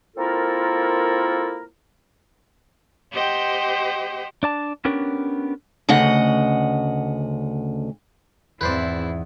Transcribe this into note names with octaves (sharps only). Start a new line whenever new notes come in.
A#3 C4 E4 F4 A4 A#4
G4 C5 D#5 F#5 G5
D4 D5 A5
B3 C#4 D4 G4 A#4 C#5
D2 C#3 D#5 F#5
E2 G#2 C4 E4 B4 C5 D5